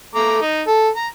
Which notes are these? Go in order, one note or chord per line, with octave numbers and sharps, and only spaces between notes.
A3 A#5 D6
D#4
A4
A#5